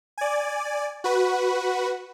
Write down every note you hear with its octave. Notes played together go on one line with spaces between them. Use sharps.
D5 G#5
F#4 B4